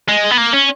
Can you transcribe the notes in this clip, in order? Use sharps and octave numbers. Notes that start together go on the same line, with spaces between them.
G#3
B3
A#3
C#4